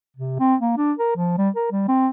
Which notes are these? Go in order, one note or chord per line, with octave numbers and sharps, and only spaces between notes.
C3
C4
A#3
D4
A#4
F3
G3
A#4
G3
C4